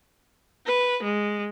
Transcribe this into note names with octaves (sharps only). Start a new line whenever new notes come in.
B4
G#3